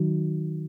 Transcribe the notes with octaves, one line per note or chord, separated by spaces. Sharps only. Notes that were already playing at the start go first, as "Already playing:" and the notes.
Already playing: D#3 F#3